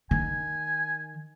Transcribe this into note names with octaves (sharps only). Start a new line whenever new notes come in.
D#3 G#5